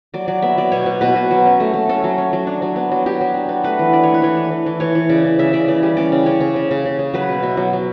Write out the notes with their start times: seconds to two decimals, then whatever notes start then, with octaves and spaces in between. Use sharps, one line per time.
0.14 F#3 D5
0.28 F#3 D5
0.42 B3 E5
0.57 F#3 D5
0.72 B2 C#5
0.86 B2
1.01 B2 B4
1.16 B2
1.31 F#3
1.46 C#4
1.60 A3
1.74 A3
1.89 C#4 A4
2.04 F#3
2.18 C#4
2.33 F#3
2.47 D4
2.62 F#3
2.76 B3
2.92 F#3
3.06 F#3 G4
3.21 F#3
3.34 D4
3.49 B3
3.64 A3 B4
3.79 E3
3.93 D4 D5
4.03 A3 C#5
4.14 B4
4.22 E3 C#5
4.37 D4
4.51 E3
4.66 E3
4.80 E3 C#5
4.95 E3
5.09 C#3 D5
5.24 C#3
5.39 C#3 E5
5.53 C#3 D5
5.68 E3 D5
5.83 G3
5.97 C#4 D5
6.12 C#3
6.26 C#4 C#5
6.40 C#3
6.56 C#3
6.71 C#3
6.85 C#3
6.99 C#3
7.13 F#3 B4
7.29 B2
7.43 B2 E5
7.57 F#3
7.73 F#3